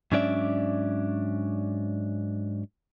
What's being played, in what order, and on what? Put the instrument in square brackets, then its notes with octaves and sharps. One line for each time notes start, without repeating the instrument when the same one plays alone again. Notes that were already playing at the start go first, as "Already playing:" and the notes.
[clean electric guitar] G#2 F#3 C#4 D4 D5 E5